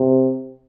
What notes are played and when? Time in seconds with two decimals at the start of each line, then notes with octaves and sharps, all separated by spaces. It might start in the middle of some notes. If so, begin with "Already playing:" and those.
Already playing: C3